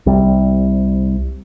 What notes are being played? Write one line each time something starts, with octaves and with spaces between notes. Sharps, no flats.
C2 C3 G3